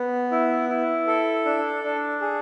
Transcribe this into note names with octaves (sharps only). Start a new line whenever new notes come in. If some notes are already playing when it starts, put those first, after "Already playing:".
Already playing: B3
E4
E4
A4
D4
D4
G#4